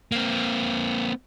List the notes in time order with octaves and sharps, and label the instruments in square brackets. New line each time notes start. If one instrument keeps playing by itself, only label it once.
[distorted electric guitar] A#3 C4